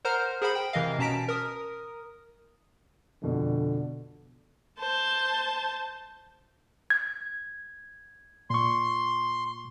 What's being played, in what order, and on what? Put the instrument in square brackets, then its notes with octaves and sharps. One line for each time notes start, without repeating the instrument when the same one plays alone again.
[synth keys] A#4 C5 F#5 A#5 F6
G#4 A#4 C5 F#5 B5
G5
C3 E3 A#4 D#5 F5
B2 C#4 A5 A#5 B6 D7
A#4 D#6
[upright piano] F2 B2 [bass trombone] D3
[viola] C5 A5
[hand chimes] G#6
[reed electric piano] A#2 C#6 [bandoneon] C6